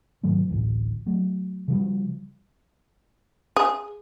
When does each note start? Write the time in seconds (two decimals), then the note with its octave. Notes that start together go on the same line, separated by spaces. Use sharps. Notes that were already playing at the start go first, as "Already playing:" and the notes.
0.23 G#2 D#3 F#3 A3
0.49 A1 D2 A2
1.06 F#3 A3
1.68 C#3 F3 G3
3.56 G#4